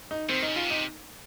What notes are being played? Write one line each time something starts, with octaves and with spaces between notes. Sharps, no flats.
D#4
D#3 C4
D#4
C#3
F4
C3
D#4